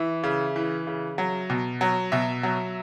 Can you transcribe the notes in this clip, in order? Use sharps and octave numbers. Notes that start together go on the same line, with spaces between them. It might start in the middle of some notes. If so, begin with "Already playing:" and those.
Already playing: E3 E5
C#3
E3
C#3
F#3
B2
F#3
B2 E5
F#3